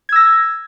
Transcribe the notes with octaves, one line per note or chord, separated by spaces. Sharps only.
E6 G#6 A#6